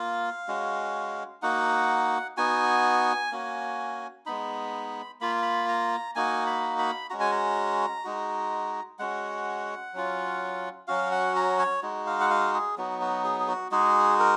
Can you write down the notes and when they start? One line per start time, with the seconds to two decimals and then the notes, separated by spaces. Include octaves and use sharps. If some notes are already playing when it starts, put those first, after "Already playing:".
Already playing: A#3 F4 F5
0.48 G#3 C#4 F#4
1.42 A#3 D#4 F#4 F#5
2.37 B3 D#4 F#4 G#5
3.31 A#3 C#4 F#4
4.26 G#3 B3 D#4 B5
5.21 A#3 F4 B5
5.42 B5
5.68 A#5
6.15 A#3 D#4 F#4 G#5
6.46 B5
6.79 B5
7.10 G#3 C#4 F#4 A#5
7.20 G#5
7.32 A#5
8.04 G#3 D#4 F#4
8.99 G#3 C#4 F#4 F#5
9.93 F#3 C#4 F4
10.87 F#3 C#4 F#4 F5
11.11 F#5
11.36 A#5
11.59 C#5
11.82 G#3 D#4 F#4
12.07 F5
12.21 F#5
12.30 F5
12.54 G#4
12.78 F#3 B3 D#4 F#4
13.01 F#4
13.24 G#4
13.40 G#4
13.48 F#4
13.71 G#3 D#4 F#4 G#4
14.19 A#4